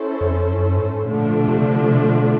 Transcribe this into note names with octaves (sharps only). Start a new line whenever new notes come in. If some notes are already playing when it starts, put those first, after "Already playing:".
Already playing: C#4 E4 A4 C5
F2
F#2
G#2
A#2 D3 F3 A3 D4
B2
C3
B2